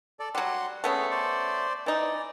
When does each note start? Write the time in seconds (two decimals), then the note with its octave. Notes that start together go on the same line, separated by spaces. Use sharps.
0.20 A4 D5
0.35 F#3 G3 F#5 C6
0.84 A3 B3 C#4 G#4
1.11 C5 D5
1.86 E3 D#4 D5